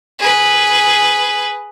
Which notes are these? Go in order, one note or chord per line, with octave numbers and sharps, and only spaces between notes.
G#4 B4